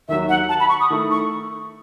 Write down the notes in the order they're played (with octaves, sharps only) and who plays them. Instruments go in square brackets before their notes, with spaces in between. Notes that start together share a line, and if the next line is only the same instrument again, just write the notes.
[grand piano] D#2 D#3 F#3 [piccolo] E5
[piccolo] F#5
A5
B5
C#6
D#6
[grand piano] D#3 A3 E4
[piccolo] C#6